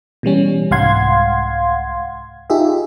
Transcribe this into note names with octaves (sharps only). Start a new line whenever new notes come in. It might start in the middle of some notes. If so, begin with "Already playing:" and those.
B2 E3 G3 C#4
C2 G#2 F5 F#5 C6 G#6
D#4 F4 G4 G#4 E5